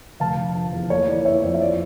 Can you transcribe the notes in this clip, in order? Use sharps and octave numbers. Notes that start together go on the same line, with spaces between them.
F1 F5 A5
D3
F3
E2
A#3 C#5
E3 D5
F2 C#5 E5
F2
E5
E3 D5